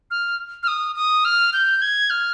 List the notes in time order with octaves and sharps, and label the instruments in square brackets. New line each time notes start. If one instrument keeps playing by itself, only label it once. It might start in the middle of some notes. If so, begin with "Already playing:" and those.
[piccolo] F6
F6
D#6
D#6
F6
G6
G#6
F6